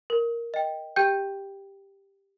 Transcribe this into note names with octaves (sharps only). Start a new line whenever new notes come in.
A#4
D#5 G5
G4 G5 G6